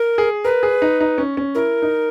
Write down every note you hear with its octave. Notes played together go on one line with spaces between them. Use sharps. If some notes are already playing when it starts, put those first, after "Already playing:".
Already playing: A#4
G#4
A#4 B4
G#4
D#4
D#4
C#4
C#4
E4 A#4
D#4